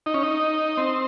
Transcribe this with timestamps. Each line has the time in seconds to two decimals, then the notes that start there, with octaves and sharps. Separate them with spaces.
0.06 D#4
0.14 C#4
0.23 D#4
0.77 C4